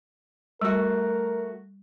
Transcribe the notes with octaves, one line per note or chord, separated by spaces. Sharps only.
G3 A3 F#4 A#4